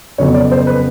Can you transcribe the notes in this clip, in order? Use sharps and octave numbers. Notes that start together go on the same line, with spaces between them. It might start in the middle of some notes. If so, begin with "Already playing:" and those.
F2 C#3 F#3 B3 C#5
D5
C5
B4